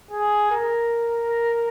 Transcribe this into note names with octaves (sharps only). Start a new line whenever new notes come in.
G#4
A#4